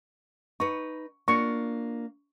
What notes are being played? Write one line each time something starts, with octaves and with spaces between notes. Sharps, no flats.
D#4 B4 C#6
A#3 D4 F4 C#6